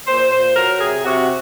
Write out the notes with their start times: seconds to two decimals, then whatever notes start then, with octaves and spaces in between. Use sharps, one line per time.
0.06 A#2 C5
0.32 A#2 C5
0.55 F#3 A#4
0.81 C3 G#4
1.05 C3 F#4